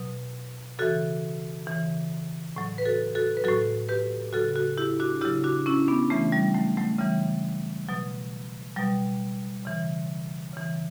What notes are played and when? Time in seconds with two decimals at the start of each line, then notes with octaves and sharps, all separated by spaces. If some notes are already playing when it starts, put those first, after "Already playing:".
Already playing: B2 F#3
0.79 C#3 E3 F#4 A4
1.67 C#3 E3
2.56 A2 F#3
2.78 B4
2.85 F#4 A4
3.15 F#4 A4
3.37 B4
3.44 A2 F#3 F#4 A4
3.89 G4 B4
4.33 C#3 F#3 F#4 A4
4.55 F#4 A4
4.78 E4 G4
5.00 D4 F#4
5.21 C#3 E4 G4
5.25 F#3
5.44 D4 F#4
5.66 C#4 E4
5.88 B3 D4
6.10 C#3 E3 A3 C#4
6.32 G3
6.54 F#3 A3
6.77 F#3 A3
6.99 C#3 E3 G3
7.88 B2 F#3
8.76 B2 F#3 G3
9.65 C#3 E3
10.53 C#3 E3